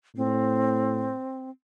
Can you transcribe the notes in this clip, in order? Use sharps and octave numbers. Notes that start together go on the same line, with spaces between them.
A2 C4